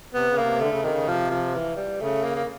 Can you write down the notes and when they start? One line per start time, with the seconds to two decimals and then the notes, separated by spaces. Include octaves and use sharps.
0.14 C3 B3
0.29 C#3
0.38 C3 A#3
0.61 D3 A3
0.71 C#3
0.81 C3 D#3
0.91 C#3
1.07 C3 F3
1.31 F3
1.55 E3
1.77 G3
2.01 C#3 A3
2.24 A#3
2.36 A#3